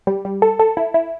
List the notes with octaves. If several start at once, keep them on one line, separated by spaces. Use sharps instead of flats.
G3
G3
A4
A4
E4
E4